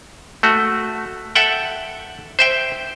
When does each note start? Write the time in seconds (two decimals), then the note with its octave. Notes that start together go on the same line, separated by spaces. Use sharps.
0.43 A3 F#4
1.35 A4 E5 F#5 G5
2.39 C5 E5 G5